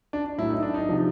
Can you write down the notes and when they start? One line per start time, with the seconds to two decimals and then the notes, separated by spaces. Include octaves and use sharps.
0.13 D4
0.38 A2 F#3 E4
0.50 D#4
0.63 D4
0.74 D#4
0.89 C3 F3